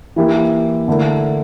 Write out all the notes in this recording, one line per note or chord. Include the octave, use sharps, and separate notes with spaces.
E3 A#3 E4 G4
D3 A3 E4 A#4